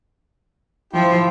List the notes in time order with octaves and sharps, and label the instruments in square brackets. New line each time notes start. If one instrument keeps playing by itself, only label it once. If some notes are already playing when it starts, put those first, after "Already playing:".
[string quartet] F3 [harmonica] E4 G4 G5